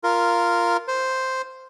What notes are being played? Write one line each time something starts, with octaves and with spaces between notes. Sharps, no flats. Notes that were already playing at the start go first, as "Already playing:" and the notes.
F4 A#4
C5